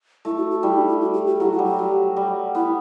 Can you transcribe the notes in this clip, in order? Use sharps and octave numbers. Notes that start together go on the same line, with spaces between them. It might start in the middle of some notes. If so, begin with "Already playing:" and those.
A3 E4
F#4
F#4
G3 E4
D#4
E4
F#4
G4
G4
F#3 E4
F#4
G3
G4
F#3
G3
B3 E4